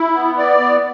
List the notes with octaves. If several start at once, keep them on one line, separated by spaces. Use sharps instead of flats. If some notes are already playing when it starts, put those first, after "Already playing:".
Already playing: E4
B3
D5
B3